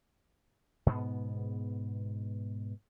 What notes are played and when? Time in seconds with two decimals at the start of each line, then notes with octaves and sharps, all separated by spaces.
0.86 G#2 B2 B3